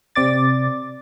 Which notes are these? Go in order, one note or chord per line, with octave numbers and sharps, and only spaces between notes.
C3 C4 D5 D6 A6